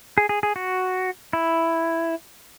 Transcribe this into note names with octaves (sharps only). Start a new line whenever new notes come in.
G#4
G#4
G#4
F#4
E4